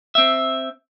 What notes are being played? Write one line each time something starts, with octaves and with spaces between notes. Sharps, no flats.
C4 E5